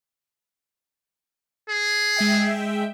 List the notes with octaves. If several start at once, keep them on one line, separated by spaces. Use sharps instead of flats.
G#4
G#3 E5 G5